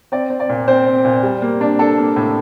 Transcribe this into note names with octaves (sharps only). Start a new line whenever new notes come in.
C4 D5
C4
D5
A#2
C4 C5
C4
A#2
G3
A#3
D4
D4 A4
A#3
A2